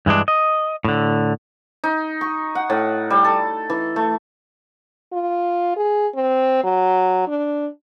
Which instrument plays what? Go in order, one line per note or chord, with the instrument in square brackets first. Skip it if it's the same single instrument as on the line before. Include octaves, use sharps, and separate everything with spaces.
[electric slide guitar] G2 E3 G#3 D4
D#5
A2 D3
[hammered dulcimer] D#4
C#6
F#5
A2
G3
A4
E3
A3
[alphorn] F4
G#4
C4
F#3
D4